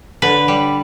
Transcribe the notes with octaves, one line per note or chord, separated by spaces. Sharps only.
D3 B4
G3